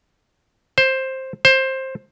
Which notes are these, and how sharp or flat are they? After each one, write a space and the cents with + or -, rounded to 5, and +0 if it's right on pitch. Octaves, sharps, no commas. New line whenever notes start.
C5 +10
C5 +15